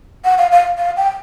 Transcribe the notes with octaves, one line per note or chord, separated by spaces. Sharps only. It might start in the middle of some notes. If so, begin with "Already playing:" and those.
F#5
F5
F5
F5
G5